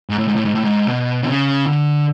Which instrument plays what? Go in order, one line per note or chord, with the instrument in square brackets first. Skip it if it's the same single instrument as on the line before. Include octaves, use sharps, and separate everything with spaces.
[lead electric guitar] G#2
A2
G#2
A2
G#2
A2
G#2
B2
D3
C#3
D3